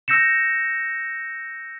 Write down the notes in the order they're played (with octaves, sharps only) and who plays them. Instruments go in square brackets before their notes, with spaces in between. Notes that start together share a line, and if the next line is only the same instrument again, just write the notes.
[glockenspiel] E6 G6 A#6 C#7 E7